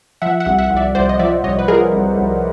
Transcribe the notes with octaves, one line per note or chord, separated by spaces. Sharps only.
F3 E5 F#5
E5 F#5
C2
E5 F#5
C2
D5 E5
C2 C5 D5
D#5
F3 D5 E5
C2 C#5 D#5
B4
F3 G#4 A#4
C2
C2